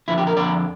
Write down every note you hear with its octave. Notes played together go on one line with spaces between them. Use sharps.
F2 D3 F3 E4
G4
A#4
F2 D3 F3 D5